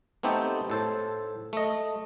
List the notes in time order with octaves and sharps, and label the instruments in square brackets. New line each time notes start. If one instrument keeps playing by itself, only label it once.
[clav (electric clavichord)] A3 B3 C4 D#4 G4 A4
A2 A4 C5
A3 D#5